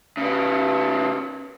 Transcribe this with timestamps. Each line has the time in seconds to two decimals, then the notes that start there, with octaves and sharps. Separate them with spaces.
0.17 C#3 B3